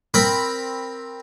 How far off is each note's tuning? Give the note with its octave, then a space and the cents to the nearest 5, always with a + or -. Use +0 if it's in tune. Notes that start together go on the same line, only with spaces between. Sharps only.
C4 +10 A#4 +0 B5 +0